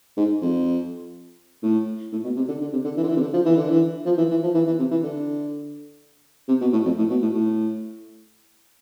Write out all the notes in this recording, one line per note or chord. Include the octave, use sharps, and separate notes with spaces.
G#2
F2
A2
A2
B2
C3
D3
D3
C3
D3
E3
D3
E3
C3
D3
F3
E3
D3
E3
F3
E3
E3
F3
E3
E3
C3
E3
D3
C3
B2
A2
F2
A2
B2
A2
A2